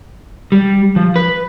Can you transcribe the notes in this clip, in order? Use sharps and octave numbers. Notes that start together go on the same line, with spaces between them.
G3
F3
B4